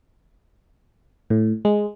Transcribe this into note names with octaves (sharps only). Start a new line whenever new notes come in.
A2
G#3